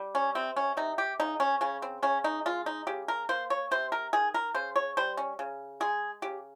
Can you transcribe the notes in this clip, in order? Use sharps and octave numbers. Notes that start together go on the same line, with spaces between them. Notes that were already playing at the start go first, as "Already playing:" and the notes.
Already playing: G3
C#4
C3 C4
C#4
C3 D#4
G4
C#3 D#4
C#4
C#3 C#4
C4
C#3 C#4
D#4
G#3 F4
D#4
C#3 G4
A#4
A#3 C5
C#5
C3 C5
A#4
D#3 G#4
A#4
C#3 C5
C#5
G3 C5
C#4
C#3
G#3 G#4
C#3 G4